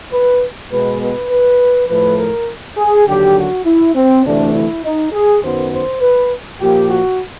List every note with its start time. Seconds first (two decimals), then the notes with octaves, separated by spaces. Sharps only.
0.12 B4
0.71 B2 G#3 B3 B4
1.01 B4
1.30 B4
1.88 A2 F3 A3 B4
2.18 A#4
2.77 G#4
3.06 D#2 D3 F#3 G4
3.36 F#4
3.65 E4
3.95 C4
4.24 D2 C3 E3 A3 D4
4.54 E4
4.84 D#4
5.12 G#4
5.42 F#2 D#3 F#3 B3 C5
5.71 C5
6.00 B4
6.59 A#2 F3 A#3 G4
6.89 F#4